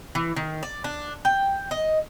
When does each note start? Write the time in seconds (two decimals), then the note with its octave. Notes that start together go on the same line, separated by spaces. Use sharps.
0.15 E3
0.36 D#3
0.63 D5
0.84 D4
1.25 G5
1.71 D#5